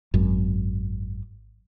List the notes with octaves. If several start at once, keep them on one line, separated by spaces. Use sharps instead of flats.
G#1 F#2